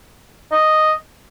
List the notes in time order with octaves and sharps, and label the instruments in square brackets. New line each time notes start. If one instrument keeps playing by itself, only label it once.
[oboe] D#5